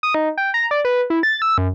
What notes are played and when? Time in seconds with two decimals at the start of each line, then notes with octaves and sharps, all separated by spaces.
0.03 D#6
0.15 D#4
0.38 G5
0.54 A#5
0.71 D5
0.85 B4
1.10 E4
1.23 A6
1.42 E6
1.58 F#2